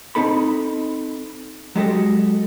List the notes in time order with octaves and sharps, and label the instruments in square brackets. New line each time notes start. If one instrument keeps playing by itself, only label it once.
[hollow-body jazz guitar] C4 D#4 A4 B5
F#3 G#3 G4 A4 D#5